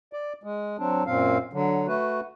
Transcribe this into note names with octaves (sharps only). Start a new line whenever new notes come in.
D5
G#3
F#3 C4 D4
F#2 A#2 C4 F5
D3 F#3
A3 F#4 B4